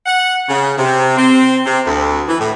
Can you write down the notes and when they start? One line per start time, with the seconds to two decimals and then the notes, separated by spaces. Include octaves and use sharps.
0.06 F#5
0.48 C#3
0.78 C3
1.17 C4
1.65 C3
1.86 D2
2.28 E3
2.39 A2